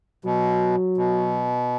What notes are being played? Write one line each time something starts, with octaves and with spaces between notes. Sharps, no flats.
B2 F#3
B2